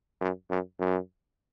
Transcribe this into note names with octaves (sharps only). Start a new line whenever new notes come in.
F#2
F#2
F#2